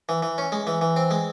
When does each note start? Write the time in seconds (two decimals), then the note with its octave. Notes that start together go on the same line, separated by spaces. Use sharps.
0.09 E3
0.23 E3
0.38 C#4
0.52 G#3
0.67 E3
0.81 E3
0.96 C4
1.11 G#3